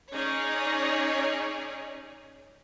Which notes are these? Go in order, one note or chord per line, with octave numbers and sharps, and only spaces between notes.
C#4 D#4 G#4 C#5 D5